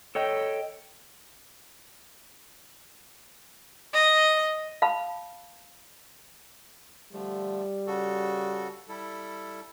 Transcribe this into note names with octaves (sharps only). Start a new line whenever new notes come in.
A4 C#5 D#5 G5
D#5
F5 A5 B5
D3 F3 G3 A3
C#3 F#4 A4
G3 E4 A4